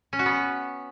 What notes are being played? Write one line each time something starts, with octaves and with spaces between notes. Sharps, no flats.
C#4
F#4
B3